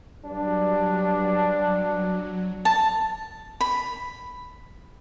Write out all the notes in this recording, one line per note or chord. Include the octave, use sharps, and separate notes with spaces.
G2 F#3 D4
A5
B5